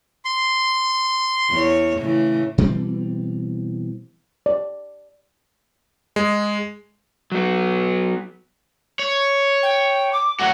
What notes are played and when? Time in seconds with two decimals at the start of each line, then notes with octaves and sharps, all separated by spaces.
0.25 C6
1.50 E2 C#5
2.00 A2 C#3 E3
2.58 B2 E3 G3 C4
4.46 D5
6.16 G#3
7.32 F#3 B3
8.99 C#5
9.62 G5
10.12 D6
10.40 F#3 A3 F#4 F#5